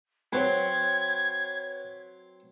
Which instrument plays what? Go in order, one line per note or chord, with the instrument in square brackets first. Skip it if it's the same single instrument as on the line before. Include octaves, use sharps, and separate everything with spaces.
[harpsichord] F#3 C4 [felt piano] B4 C#5 [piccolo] G#6